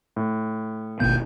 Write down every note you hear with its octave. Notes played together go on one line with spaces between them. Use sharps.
A2
G#1 D#2 B2 A#3 G6